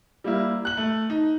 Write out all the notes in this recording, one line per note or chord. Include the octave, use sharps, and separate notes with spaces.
G3 A#3 E4
F#6 F#7
A3
D#4